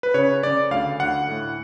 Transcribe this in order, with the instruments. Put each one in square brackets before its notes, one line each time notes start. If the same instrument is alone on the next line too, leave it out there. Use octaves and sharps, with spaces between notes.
[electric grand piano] B4
C#3 C#5
C#3 D5
D2 F5
D2 F#5
A2